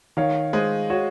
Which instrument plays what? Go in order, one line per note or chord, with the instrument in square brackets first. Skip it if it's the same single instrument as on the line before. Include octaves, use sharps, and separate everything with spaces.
[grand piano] D#3 [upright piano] C#5 F5
[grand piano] G#3 [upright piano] C5 D#5
[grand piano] F#4 [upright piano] C#5